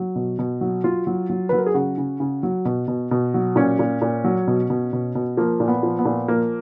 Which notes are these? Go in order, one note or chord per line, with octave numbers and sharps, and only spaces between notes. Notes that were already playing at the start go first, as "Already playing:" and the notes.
Already playing: F#3
B2
B2
F#3
F#3 F4
F#3
F#3
F#3 B4
A#4
G#4
C#3 F#4
C#3
C#3
F#3
B2
B2
B2
F#3
A#2 C#4
A#2
A#2
F#3
B2
B2
B2
B2
F3 A#3
A#2
B3
F3
B3
A#2
F3 A#3